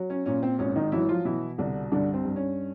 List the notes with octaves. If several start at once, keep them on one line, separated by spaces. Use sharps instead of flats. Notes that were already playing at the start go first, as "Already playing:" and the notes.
Already playing: F#3
C#4
A#2 C#4
C4
G#1 C#4
D#3 D#4
E3 F#3 E4
F3 F4
B2 E3 E4
C2 D3 D4
G2 D3 D4
C4
G2
C#4